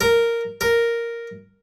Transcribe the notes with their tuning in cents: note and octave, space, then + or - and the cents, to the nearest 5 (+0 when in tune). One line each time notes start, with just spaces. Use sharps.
A#4 -5
A#4 +0